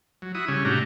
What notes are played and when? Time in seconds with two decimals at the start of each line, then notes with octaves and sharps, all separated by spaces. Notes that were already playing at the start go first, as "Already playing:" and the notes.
0.22 F#3
0.35 E4 F#4 D#6
0.48 C#3 G3 C#4
0.65 A2 C3 D4 F#4 G4 A#5